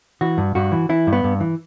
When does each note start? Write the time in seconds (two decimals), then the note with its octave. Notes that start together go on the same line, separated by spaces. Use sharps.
0.21 E3 F#4
0.38 G2
0.55 G2 F#4
0.72 E3
0.89 E3 E4
1.07 G2
1.13 B3
1.24 G2
1.40 E3